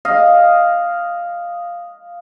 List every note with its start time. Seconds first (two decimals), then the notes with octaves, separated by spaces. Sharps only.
0.05 D#5 F5